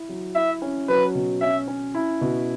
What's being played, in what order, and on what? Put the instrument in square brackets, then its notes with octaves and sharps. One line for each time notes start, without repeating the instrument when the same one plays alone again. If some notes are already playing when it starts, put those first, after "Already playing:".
Already playing: [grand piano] E4
F#3
[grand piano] E4 [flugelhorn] E5
[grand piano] C#4
[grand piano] F#3 [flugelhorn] B4
[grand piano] B2
[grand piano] C#4 [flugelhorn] E5
[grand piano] C#4
E4
B2